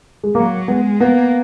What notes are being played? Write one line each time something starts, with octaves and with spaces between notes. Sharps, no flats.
G#3
F#3 A#3
G#3 B3
A#3 B3